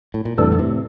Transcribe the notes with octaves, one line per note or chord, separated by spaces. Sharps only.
A2
A#2
F2 A2 C3 E3 G3 D4 A4
D3
A2 C3